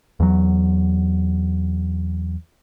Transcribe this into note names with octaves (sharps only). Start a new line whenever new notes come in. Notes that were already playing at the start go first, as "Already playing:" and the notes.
E2 F#3